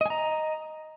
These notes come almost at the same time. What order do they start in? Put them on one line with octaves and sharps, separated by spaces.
D#5 G#5 A#5